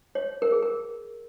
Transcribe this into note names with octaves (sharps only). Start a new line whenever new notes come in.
C#5
A#4
G#4
A#4